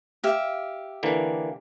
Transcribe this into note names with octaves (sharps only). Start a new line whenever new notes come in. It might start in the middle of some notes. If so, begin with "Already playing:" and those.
G4 E5 F5
D3 E3 A#3